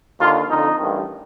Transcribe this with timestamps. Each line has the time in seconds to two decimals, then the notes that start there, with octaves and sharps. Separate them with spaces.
0.20 D#2 D3 F4
0.48 F2 D3 D#4
0.77 A1 G2 D#3